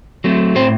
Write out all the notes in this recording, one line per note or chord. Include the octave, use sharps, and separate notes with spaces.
F#3 A3 C4
A2 C4 C5